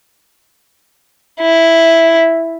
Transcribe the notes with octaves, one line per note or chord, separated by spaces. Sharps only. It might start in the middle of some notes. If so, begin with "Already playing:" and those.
E4